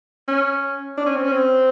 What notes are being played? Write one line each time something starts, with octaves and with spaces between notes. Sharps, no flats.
C#4
D4
C#4
C4
C#4
C4